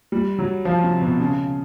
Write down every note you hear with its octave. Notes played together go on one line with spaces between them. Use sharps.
G3
F#3
F3
C3
B2
C#3